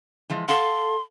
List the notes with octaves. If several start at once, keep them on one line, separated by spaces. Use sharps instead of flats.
E3 F3 G#3
A4 F5 F#5 C6